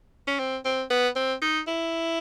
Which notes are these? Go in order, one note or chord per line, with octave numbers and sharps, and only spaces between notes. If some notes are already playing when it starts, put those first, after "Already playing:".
C#4
C4
C4
B3
C4
D#4
E4